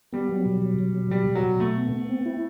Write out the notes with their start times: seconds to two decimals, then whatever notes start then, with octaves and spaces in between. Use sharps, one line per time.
0.13 G3 B3
0.29 F#3
0.46 B2
0.62 F#3
0.79 B2
0.95 F#3
1.11 B2 G3
1.27 B2
1.35 F#3
1.44 B2
1.60 B2 A3
1.76 B3
1.93 B3
2.09 C4
2.26 E4